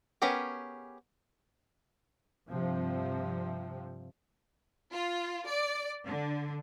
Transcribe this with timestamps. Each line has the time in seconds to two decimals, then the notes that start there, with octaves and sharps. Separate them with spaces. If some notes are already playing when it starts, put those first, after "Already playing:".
0.22 B3 C#4 G4 G#4 A#4
2.49 G2 C3 F3 C4
4.91 F4
5.47 D5
6.06 D3